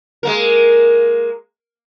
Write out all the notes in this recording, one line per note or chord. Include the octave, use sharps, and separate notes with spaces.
G#3 A#3 A#4